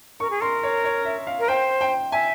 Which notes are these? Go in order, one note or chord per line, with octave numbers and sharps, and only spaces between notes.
A#4 C#6
G#4
A#4 C6
C#5
C#5
E5
F5
A#4
C5 G5
G5
E5 G#5